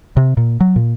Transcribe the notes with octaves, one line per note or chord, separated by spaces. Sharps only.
C3
A#2
F#3
A#2